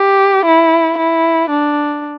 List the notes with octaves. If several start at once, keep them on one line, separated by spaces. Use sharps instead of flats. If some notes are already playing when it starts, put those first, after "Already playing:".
Already playing: G4
E4
E4
D4